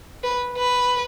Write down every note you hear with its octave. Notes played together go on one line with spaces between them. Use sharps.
B4
B4